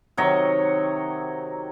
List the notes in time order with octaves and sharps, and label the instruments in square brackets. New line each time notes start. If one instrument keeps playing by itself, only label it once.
[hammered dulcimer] C3 D#3 F#3 C#5 D#5